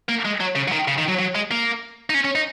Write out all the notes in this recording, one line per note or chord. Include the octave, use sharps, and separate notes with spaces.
A#3
G#3
F#3
C#3
F#3
D#3
C#3
D#3
F#3
F#3
G#3
A#3
D#4
C#4
C#4
D#4